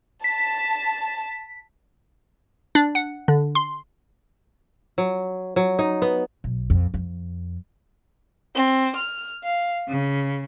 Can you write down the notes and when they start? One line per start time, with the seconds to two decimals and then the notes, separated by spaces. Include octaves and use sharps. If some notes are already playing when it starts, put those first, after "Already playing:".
0.24 A5 B6
2.75 D4
2.95 F#5
3.28 D3
3.55 C6
4.98 F#3
5.56 F#3
5.79 D#4
6.02 B3
6.44 B1
6.70 F2
6.94 F2
8.55 C4
8.96 F6
9.44 F5
9.88 C#3